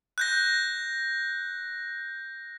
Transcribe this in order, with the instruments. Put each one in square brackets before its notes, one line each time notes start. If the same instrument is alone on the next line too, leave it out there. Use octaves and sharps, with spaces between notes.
[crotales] F#6 G6 A#6